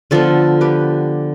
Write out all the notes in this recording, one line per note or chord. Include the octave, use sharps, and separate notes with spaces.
D3 F3 B3 F4 A4
G4 B4